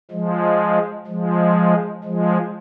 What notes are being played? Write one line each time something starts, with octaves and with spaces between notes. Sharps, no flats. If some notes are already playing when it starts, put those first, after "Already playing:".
F3 G#3
F3 G#3
F3 G#3